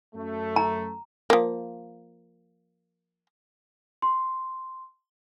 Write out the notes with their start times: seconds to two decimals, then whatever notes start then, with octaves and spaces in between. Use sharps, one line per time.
0.15 F#2 A3
0.56 A#5
1.30 F3 A#3
4.02 C6